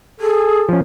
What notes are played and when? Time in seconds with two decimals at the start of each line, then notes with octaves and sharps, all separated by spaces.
0.20 G#4 A4
0.69 F3 C#4